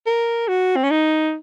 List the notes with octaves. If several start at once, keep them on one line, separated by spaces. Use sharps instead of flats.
A#4
F#4
C4
C#4
D#4